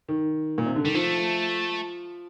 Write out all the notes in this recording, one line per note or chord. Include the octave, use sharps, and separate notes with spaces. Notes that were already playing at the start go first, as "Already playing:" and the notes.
D#3
A#2
C3
D3
D#3 G3
F3 A3